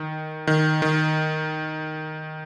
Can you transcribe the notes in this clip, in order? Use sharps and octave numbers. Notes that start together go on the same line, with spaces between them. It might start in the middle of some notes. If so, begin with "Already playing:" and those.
Already playing: D#3
D#3
D#3